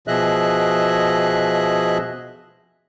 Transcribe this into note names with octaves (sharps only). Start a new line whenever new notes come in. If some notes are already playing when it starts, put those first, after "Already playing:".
B2 F3 G#4 D#5 E5 F#6